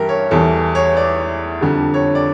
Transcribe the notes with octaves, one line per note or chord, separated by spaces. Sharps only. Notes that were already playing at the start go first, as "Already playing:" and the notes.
Already playing: G2 E3 G4 A#4
C#5
E2 E3 G3 A4
C#5
D5
F2 D3 G3
C#5
D5